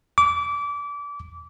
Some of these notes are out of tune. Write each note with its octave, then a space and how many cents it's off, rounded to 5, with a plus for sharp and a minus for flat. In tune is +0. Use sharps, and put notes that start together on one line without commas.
D6 -25